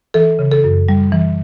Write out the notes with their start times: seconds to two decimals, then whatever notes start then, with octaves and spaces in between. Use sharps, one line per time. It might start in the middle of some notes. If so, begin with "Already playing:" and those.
0.14 E3 A4
0.39 C#3
0.52 A4
0.64 F#2
0.89 G3
1.12 E3